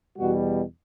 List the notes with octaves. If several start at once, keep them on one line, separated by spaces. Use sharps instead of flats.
E2 B2 G3 F#4